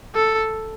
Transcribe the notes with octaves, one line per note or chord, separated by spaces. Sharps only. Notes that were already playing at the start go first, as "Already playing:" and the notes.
A4